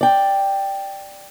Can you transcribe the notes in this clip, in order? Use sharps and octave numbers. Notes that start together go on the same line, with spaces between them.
D5 G5